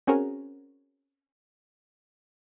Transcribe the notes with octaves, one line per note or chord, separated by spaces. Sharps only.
C4 C#4 F#4 G#4 A#4